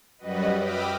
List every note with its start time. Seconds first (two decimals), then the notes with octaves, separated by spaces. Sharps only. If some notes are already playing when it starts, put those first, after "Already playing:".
0.18 F#2 G3 F#4 B4 D#5
0.59 E5 G5 B5 D6 D#6 F6